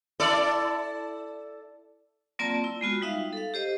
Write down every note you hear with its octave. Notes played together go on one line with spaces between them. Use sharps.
E4 A4 D5
F#3 A#3 C4 F4 D5 A5
E4
G#3 B3 F4 F#4
G3 D#4 E5 F5
A4 F5
G4 C5 D#5